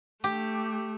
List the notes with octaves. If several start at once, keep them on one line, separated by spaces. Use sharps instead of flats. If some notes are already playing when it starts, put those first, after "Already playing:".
A3 G4